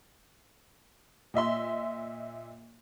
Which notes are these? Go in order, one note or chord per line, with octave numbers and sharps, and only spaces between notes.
A#2 D#5 E5 C6